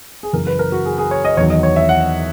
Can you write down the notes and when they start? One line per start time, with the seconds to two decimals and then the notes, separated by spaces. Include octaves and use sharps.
0.23 G#4
0.33 F#2 C#3 E3 A#4
0.47 B4
0.59 A#4
0.72 F#4
0.85 G#4
0.98 G#4
1.11 C#5
1.24 D#5
1.37 E2 D#3 F#3 C#5
1.50 D#5
1.63 C#5
1.76 E5
1.89 F#5